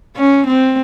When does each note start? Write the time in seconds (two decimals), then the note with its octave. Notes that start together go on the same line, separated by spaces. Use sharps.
0.16 C#4
0.47 C4